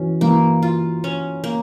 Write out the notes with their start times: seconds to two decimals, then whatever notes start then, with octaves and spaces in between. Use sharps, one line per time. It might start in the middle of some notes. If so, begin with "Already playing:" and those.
Already playing: E3 F#3 C#4
0.21 E3 A#3
0.63 F4
1.04 C#4
1.44 A#3